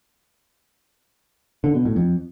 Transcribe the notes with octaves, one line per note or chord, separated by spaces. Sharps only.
D3
B2
A2
F2